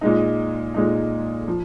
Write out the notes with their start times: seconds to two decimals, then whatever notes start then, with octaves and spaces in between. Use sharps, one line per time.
0.01 A#2 G#3 D#4
0.74 A#2 G#3 D#4
1.48 F3